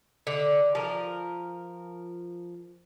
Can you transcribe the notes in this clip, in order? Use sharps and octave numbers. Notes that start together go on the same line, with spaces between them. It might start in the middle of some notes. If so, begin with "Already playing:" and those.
D3
F3 A#4